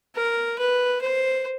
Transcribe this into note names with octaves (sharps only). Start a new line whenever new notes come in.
A#4
B4
C5